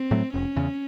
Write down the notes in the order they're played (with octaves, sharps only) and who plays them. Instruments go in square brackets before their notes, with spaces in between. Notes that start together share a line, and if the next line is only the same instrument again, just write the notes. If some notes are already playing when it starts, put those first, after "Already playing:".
Already playing: [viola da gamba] C4
[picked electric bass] A2 F#3 A3
[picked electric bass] F1 [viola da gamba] C#4
[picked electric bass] E2 C#3